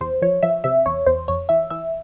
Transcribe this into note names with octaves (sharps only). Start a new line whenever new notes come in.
E2 C5
F3 C#5
F3 E5
C3 E5
E2 C#5
E2 C5
F2 C#5
E3 E5
E3 E5